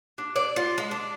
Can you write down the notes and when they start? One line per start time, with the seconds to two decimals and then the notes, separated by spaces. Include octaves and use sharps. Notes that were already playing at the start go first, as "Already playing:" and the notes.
0.18 D4
0.36 D5
0.56 F4
0.78 G#3
0.91 D4